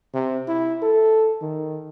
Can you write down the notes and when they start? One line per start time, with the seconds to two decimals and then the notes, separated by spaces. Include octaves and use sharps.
0.14 C3
0.48 E4
0.83 A4
1.42 D#3